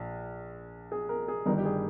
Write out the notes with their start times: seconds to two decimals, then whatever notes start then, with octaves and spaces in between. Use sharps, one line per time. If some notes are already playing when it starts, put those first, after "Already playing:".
Already playing: A#1
0.92 G#4
1.09 A#4
1.28 G#4
1.46 G1 G2 D#3 A#4
1.58 G4
1.65 G#4